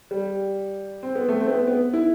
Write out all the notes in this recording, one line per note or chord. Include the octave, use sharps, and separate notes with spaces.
G3
C4
B3
A3
C4
B3
B3
E4